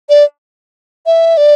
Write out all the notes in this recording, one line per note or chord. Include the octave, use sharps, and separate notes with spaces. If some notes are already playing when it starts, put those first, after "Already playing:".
D5
E5
D5